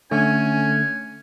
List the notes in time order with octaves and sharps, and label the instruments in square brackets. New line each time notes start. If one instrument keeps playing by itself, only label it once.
[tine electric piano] D3 A3 [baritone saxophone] C#4 [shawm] G#5